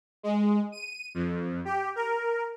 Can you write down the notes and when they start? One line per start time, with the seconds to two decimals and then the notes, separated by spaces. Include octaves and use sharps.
0.23 G#3
0.72 D#7
1.14 F2
1.65 G4
1.96 A#4